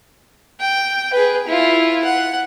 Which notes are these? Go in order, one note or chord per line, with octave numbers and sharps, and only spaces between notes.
G5
G#4 B4
E4 F4
F#5